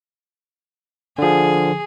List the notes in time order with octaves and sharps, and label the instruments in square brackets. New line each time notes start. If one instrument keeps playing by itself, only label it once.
[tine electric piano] D3 F3 [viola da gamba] G#4